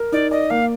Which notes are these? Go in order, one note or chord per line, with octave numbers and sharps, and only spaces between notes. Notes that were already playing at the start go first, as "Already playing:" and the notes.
Already playing: A#4
D#4 D5
D5 D#5
A#3 F5